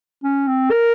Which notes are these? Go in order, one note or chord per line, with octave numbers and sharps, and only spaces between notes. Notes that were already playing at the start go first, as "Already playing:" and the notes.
C#4
C4
A#4